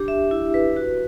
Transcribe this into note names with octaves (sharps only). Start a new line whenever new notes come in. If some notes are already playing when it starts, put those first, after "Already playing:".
Already playing: D4 G4
E5
E4
B4
F#4